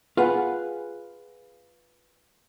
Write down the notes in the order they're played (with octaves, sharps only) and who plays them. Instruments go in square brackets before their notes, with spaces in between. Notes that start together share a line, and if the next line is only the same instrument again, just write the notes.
[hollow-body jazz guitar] F4 G#4 B4 F#5